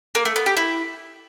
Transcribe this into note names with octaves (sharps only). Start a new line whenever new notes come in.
A#3
A3
B3
G4
E4